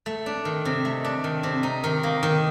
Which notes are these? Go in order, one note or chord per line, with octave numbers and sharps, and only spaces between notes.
A3
D4
D#3
C3
A3
D4
D#3
C3
D#4
D#3
A#3
D#3